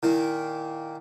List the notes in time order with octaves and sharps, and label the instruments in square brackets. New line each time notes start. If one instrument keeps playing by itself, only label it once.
[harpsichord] A#2 D#3 A#3 [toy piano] E4